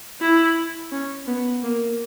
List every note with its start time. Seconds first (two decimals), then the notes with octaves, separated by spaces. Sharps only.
0.21 E4
0.92 C#4
1.27 B3
1.63 A#3